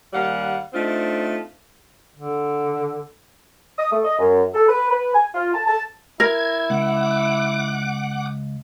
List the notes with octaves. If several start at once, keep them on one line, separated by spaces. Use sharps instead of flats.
D#2 G3 F5 F#5
A3 C4 D4 D#4 F4
D3
D#6
A3
D#5
F#2
A4
B4
B4
G#5
F4
A5
A5
E4 A#4 G#6
C#2 F#5 D6